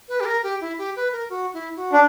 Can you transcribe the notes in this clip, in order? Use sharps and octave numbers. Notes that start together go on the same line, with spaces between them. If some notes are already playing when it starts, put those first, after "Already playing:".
B4
G4
A#4
G4
E4
G4
B4
A#4
F#4
E4
F#4
D4